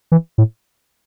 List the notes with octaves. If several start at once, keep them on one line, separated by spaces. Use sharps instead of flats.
E3
A2